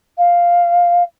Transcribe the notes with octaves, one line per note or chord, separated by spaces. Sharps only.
F5